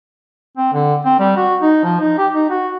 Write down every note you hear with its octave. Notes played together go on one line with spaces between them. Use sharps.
C4
D3
C4
G3
F#4
D#4
F3
D#4
G4
D#4
F#4